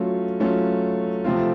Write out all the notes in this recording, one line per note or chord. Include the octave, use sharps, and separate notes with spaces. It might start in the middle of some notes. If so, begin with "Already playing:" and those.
Already playing: F#3 A3 C#4 F4
F#3 A3 C#4 F4
C3 F3 A3 C4 F4